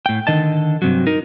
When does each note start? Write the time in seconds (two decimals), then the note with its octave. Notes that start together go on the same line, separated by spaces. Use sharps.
0.06 A2 G5
0.27 D3 D#3 D#5 A5
0.82 G2 C3 F#3
1.07 D#4 A#4